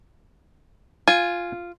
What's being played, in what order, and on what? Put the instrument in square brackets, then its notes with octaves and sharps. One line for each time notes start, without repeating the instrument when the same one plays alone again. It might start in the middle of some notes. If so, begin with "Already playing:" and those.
[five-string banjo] F4 [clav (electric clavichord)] G#5